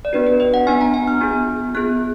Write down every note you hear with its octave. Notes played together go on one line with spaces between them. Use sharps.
D5
B3 D4 F#4 B4
B4
D#5
F#5
B3 D4 F#4 G#5
A#5
G#5
F6
B3 F4 G#4
B3 F4 G#4 F#6